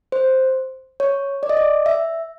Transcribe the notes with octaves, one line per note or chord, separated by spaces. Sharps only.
C5
C#5
D5
D#5
D5
E5